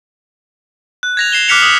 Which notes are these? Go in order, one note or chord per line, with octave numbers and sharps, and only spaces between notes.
F#6
G#6 A#6 F7
C7 E7 G7
D6 F6 F#6 B6 C#7 F7
D#6 B6